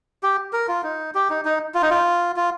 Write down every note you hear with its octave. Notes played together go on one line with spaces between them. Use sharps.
G4
A#4
F4
D#4
G4
D#4
D#4
F4
D#4
F4
F4